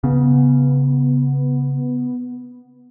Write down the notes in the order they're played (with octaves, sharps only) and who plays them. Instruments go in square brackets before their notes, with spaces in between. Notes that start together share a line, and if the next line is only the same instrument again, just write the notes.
[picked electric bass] C#3 [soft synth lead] B3